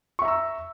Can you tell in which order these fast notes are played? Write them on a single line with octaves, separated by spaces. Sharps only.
C#6 E5 A#5 E6